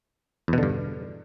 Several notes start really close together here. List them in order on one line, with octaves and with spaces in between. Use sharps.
E2 B2 D3 G2